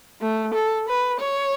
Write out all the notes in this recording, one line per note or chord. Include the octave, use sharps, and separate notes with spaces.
A3
A4
B4
C#5